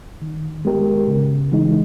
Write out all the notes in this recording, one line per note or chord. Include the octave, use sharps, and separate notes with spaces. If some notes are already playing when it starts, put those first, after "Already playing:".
D#3
G#3 B3 G4 A#4
C#3
E3 G#3 D#4